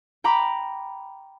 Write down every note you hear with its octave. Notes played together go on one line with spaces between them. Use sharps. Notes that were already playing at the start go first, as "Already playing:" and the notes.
G5 A#5 B5 D6